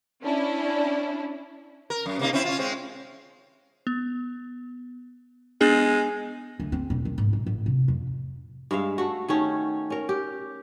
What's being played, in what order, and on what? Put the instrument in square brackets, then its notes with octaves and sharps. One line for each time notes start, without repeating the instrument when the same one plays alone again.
[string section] C#4 D4 E4
[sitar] A#4
F#2
C3 A#3 D#4
C4 C#4 E4
C#4 F4
G#3 C4 C#4
[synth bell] B3
[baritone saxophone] G#3 [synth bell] B3 D4 G#4
[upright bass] D2
C4
E1
D#3
G#2
G#2
A1
C3
F2
[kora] G2 G#3 E5 F5
A3 F#4
D#3 A3 C#4 G#4
C#4 A#4
G4